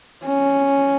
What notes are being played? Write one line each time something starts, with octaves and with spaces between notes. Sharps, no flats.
C#4